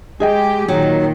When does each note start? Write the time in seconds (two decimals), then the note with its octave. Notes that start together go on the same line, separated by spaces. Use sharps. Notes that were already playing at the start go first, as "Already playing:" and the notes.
0.20 G#3 G4 G#4 D#5 G5
0.68 A#2 D#3 F#3